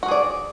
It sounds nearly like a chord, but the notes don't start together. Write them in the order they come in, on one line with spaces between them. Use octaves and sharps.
F#4 A#4 G#4 D5